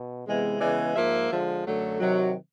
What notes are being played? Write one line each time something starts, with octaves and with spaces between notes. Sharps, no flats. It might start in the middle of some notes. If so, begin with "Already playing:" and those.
Already playing: B2
C3 E3 G#3 B3
C#3 E3 G#3 B3 D5
G#2 F3 A#3 E5
D3 F3 G#3
F#2 D3 F#3 A3
C3 D#3 F#3